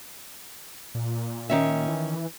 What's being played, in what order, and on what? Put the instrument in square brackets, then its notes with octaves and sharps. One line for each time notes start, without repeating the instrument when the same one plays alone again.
[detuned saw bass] A#2
[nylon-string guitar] D#3 C#4 E5
[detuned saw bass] E3